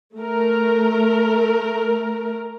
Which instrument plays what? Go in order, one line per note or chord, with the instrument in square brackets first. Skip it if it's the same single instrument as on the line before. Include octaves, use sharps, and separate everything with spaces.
[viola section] A3 A#4